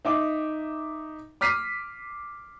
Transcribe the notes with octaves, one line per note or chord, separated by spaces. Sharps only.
D#4 E5 D6
D6 F6 B6 C7 D#7